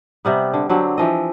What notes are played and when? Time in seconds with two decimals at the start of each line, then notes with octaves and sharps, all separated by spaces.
0.25 C3 G3 B3
0.53 D3
0.69 D3 F#3 C4 G4
0.98 E3 F3 D#5